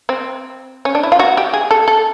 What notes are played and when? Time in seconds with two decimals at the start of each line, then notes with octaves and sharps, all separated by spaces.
0.09 C4
0.85 C#4
0.95 D4
1.03 E4
1.12 F4
1.19 F#4
1.37 G4
1.53 G#4
1.71 A4
1.88 A4